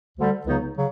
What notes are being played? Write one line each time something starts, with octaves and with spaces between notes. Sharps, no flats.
D2 D3 G3
C#2 C#3 F#3 B3 D#4
C#3 F#3